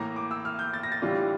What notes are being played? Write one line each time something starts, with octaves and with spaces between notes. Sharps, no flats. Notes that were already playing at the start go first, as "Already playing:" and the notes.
Already playing: A2 E3 A#3 A#5
D6
E6
F6
G6
A6
A#6
A6
A2 E3 G3 D4 F4